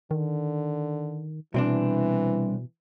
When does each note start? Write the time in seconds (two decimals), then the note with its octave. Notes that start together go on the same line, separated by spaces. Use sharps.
0.11 D3 D#3
1.54 C2 B2 E3 C4 D4